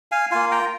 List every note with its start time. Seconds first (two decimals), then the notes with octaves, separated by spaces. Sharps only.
0.12 F5 G#5
0.31 A#3 F4 F5 G#5
0.51 G5 A#5